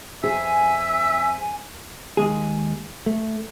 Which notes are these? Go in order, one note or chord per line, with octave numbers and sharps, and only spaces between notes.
F2 G#4 E5 G#5
D#2 G#3 G#4
A3